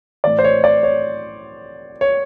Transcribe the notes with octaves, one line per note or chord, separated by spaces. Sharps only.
A2 E3 D5
C5
C#5
D5
C#5
C#5